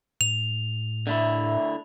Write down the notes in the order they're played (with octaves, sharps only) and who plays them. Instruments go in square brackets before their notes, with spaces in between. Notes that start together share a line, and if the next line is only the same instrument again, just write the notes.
[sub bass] A2 [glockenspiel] F7
[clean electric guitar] D3 A3 E4